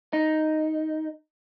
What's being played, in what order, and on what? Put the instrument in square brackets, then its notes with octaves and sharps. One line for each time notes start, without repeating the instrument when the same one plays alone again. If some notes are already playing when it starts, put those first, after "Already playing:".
[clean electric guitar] D#4